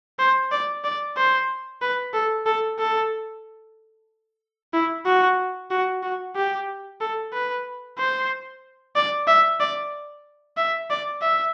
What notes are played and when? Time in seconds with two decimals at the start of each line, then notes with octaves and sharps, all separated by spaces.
0.19 C5
0.52 D5
0.84 D5
1.17 C5
1.82 B4
2.14 A4
2.46 A4
2.79 A4
4.74 E4
5.06 F#4
5.71 F#4
6.03 F#4
6.36 G4
7.01 A4
7.33 B4
7.98 C5
8.96 D5
9.28 E5
9.60 D5
10.57 E5
10.90 D5
11.22 E5